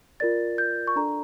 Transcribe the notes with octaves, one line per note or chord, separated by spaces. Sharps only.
F4 A#4 D5 A6
G6
C#6
D4 A4 D5 A#5